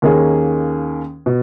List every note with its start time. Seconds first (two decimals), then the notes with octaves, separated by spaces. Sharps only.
0.02 D#2 D#3 A#3 C#4 G#4
1.26 B2